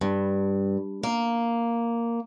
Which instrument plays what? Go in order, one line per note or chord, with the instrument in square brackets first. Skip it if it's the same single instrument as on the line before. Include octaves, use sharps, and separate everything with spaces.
[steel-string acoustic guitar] G2
A#3